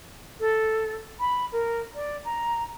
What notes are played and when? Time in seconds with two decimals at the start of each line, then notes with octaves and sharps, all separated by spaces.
0.39 A4
1.19 B5
1.52 A#4
1.94 D5
2.24 A#5